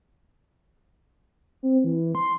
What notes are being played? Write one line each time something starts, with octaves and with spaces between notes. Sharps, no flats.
C4
E3
C6